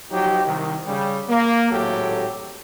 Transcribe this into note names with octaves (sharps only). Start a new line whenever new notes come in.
F3 F#3 D#4 G4
C2 D#3
C#3 G3
A#3
G#1 A2 F#3 G4 A4